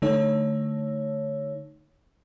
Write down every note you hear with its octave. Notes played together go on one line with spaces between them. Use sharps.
D3 A3 D#4 C#5